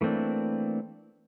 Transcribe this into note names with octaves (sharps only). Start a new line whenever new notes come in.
E3 A3 A#3 C4 D4